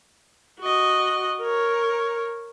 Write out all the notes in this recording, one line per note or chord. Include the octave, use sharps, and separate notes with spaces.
F#4 D#5
A#4 C#5